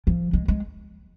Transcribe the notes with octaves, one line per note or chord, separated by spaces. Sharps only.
F3
G#3
G#3